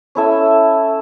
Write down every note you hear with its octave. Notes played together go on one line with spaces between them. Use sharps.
C#4 E4 A4 E5